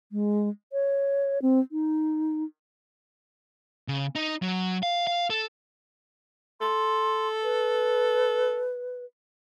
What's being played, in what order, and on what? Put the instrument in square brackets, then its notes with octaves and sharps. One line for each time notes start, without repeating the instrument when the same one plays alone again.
[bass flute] G#3
C#5
C4
D#4
[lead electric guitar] C#3
D#4
F#3
F5
F5
A4
[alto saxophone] A4 [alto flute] C6
[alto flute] B4